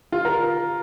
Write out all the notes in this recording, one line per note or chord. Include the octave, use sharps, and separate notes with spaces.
F4
A#4